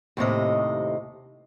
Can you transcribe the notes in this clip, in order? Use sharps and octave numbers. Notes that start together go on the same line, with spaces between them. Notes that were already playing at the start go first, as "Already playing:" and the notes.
D#2 A2 C3 D#5